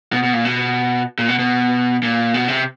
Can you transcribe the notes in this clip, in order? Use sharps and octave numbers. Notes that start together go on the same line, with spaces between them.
B2
B2
A#2
B2
A#2
B2
B2
A#2
B2
C3